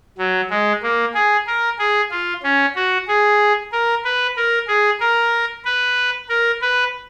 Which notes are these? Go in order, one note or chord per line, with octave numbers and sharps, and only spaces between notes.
F#3
G#3
A#3
G#4
A#4
G#4
F4
C#4
F#4
G#4
A#4
B4
A#4
G#4
A#4
B4
A#4
B4